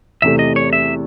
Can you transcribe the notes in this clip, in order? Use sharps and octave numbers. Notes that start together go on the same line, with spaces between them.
E2 C3 E3 A3 E5
D#5
C#5
E5